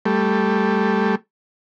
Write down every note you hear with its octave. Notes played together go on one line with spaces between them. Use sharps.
G3 A3